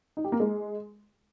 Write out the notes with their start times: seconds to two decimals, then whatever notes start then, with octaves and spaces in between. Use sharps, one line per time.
0.17 D#4
0.25 G4
0.32 A#3
0.40 G#3